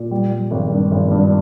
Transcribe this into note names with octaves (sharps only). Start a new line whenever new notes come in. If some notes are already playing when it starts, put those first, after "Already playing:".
Already playing: A#2
G3
G3
G#1
G2
G#1
G2